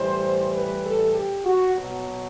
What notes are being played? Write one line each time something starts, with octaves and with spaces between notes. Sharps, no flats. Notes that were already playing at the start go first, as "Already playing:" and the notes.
Already playing: A2 E3 G3 C5
B4
A4
G4
F#4
B2 F#3